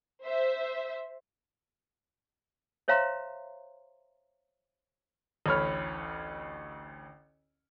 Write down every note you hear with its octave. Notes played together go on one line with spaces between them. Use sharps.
C5 E5
C5 C#5 E5 F5 A#5 C6
A1 D2 C#5 B5 F6